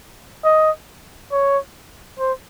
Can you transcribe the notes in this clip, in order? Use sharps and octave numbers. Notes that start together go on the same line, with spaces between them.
D#5
C#5
C5